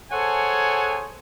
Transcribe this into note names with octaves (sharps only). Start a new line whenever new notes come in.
G#4 A4 C5 C#5 F#5 G#5